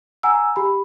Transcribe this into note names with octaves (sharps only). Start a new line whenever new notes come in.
F#5 G#5 A#5 E6
G4 B5